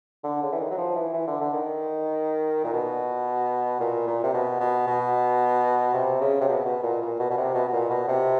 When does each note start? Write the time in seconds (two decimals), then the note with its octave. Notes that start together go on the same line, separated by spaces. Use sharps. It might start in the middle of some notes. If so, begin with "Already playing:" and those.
0.24 D3
0.42 C#3
0.52 E3
0.60 D#3
0.71 F#3
0.77 F3
0.96 E3
1.14 E3
1.27 D3
1.41 D3
1.53 D#3
2.64 A#2
2.73 B2
3.80 A#2
4.07 A#2
4.23 C3
4.34 B2
4.60 B2
4.87 B2
5.94 C3
6.21 C#3
6.41 C3
6.48 B2
6.65 B2
6.83 A#2
7.01 A#2
7.19 B2
7.30 B2
7.37 C3
7.54 B2
7.68 B2
7.73 A#2
7.90 B2
8.08 C3